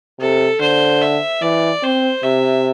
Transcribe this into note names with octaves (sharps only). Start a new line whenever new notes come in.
C3 A4
D3 C5
E5
E3 D5
C4 C5
C3 E5